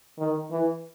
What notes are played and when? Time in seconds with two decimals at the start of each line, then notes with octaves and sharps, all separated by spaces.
0.19 D#3
0.51 E3